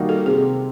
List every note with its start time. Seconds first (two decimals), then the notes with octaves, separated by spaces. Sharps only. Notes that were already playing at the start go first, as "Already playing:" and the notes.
Already playing: D#3 G3 A#3 D#4 F#4
0.09 A4
0.26 C3 G#4